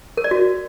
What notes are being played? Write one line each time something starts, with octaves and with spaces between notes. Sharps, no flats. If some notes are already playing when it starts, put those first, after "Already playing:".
A#4
D5
F#4